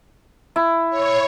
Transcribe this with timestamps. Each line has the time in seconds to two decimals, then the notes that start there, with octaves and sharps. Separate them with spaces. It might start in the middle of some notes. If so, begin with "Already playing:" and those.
0.56 E4
0.90 C#5